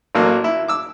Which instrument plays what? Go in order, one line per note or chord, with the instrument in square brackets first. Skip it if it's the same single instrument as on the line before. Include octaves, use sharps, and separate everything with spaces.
[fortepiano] A1 F#3 A#3
E4
D6 E6